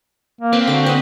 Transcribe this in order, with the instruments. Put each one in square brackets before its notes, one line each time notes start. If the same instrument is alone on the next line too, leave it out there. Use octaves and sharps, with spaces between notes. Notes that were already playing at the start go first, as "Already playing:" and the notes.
[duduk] A#3
[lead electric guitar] C4 [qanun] B4
[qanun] D3 D6 [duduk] F#4
[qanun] B4 D#5